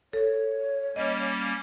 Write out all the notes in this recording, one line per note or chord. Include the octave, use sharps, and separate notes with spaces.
A4 C#5
G3 A#3 C#4 D#5